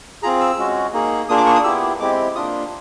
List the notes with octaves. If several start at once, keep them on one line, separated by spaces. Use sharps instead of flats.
C4 F4 G#4 A#5
E6
G#3 C#4 F#4
A#3 D#4 G#4
A#3 D4 F4 G#4 D#6
D6
C#6
D#6
B3 E4 G4 E6
G#3 C4 E4 G4 D6
A#3 D4 F4 D#6